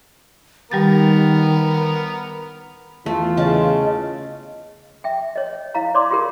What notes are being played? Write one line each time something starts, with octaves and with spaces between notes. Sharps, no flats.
D#3 G3 B3 G4 A#4 A6
E2 E3 A3 F4
C#3 D#5 A5
E5 G5
C#5 D#5
E4 F5 A#5
C#5 D5 C6 D6
F4 G4 A#4